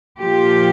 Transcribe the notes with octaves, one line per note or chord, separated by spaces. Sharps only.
A#2 F3 A#3 F4 G4